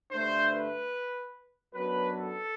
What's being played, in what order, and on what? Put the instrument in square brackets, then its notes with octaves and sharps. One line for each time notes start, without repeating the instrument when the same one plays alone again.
[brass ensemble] G2 D3 A3 D4 C5
B4
F#2 F#3 B3 D4 B4
A4